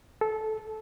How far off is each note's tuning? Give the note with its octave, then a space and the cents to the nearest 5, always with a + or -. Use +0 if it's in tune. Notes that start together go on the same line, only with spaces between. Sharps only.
A4 -15